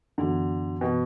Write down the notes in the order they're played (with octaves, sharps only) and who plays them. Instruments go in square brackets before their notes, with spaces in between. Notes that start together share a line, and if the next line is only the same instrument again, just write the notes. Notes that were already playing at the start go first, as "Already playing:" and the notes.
[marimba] F#2 E3 B3 F#4 [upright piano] D3
[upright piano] B2 [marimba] E3 B3 F#4